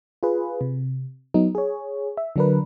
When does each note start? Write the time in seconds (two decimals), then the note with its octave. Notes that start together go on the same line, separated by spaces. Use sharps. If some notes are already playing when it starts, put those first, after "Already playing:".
0.23 F4 G#4 B4
0.61 C3
1.34 F#3 B3 D#4
1.55 G#4 C#5
2.17 E5
2.36 D3 F#3 D4 A#4 B4